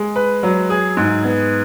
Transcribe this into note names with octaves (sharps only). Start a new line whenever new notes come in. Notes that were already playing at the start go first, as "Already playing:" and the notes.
Already playing: G#3
B4
F#3
G#4
G#2
B3